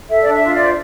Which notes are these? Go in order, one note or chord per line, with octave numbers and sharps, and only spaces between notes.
A4 E5
D4 D5
E5
F4
D5
C5